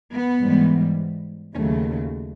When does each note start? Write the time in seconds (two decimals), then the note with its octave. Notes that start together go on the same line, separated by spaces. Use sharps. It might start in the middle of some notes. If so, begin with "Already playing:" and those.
0.12 B3
0.40 G#2 E3 G3
1.55 D#2 C#3 F#3 A3 C#4